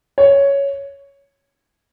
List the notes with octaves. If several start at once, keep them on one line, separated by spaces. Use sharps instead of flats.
C#5